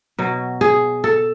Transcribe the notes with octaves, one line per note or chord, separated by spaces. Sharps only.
B2 F#3
G#4
A4